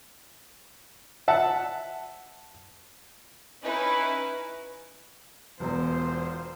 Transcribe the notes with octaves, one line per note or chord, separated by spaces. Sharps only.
E5 F#5 A5
C#4 D#4 E4 B4
E1 E2 F4 C5